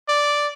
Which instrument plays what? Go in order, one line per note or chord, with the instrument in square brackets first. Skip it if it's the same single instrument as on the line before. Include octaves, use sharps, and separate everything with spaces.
[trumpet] D5